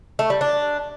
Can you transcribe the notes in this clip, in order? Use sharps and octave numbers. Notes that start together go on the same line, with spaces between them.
A3
G3
D4